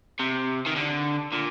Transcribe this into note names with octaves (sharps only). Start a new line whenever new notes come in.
C3
D#3
D3
A#2